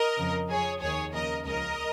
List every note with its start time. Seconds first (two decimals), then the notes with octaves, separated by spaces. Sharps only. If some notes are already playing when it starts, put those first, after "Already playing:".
Already playing: A#4 D#5
0.18 F2 C#3 F3
0.50 F2 F3 G#4 C#5
0.82 D#2 D#3 G#4 C#5
1.13 D#2 C#3 F3 A#4 D#5
1.45 C#2 C#3 F3 A#4 D#5